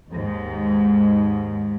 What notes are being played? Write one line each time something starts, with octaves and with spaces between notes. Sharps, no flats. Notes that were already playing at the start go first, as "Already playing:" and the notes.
D#2 G#2